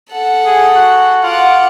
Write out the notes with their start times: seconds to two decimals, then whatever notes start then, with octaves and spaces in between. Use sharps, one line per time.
0.11 A4 F#5
0.46 G#4
0.75 F#4
1.23 F4 F#5 D6